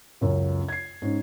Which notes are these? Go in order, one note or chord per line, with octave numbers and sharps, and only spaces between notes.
C#2 F#2
G#6 C7
G#2 C#4